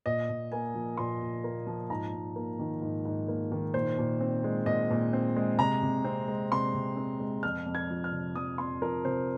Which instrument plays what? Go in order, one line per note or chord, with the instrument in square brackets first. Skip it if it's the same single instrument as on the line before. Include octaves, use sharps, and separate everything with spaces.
[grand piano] A#2 D#5
A#2
A#3 G#5
F3
A#2 C6
A#2
A#3
F3
G#2 A#5
G#2
A#3
D#3
G#2
G#2
A#3
D#3
A#2 C5
A#2
C4
G#3
A#2 D#5
A#2
C4
G#3
C3 A#5
C3
C4
G#3
C3 C6
C3
C4
G#3
F2 F6
F2
G#6
F3
F6
C3
F2 D#6
F2 C6
F3 A#4
C3 C5